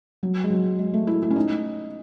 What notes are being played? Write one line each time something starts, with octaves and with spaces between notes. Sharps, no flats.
F#3
G#3
F#3
G#3
A3
E4
E4
C#4
D#4